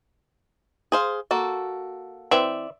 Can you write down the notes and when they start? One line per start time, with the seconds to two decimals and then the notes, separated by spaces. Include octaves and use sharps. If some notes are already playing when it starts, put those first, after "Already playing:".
0.92 G#4 C5 F5
1.31 A#3 F#4 A4
2.31 E3 C4 D5 E5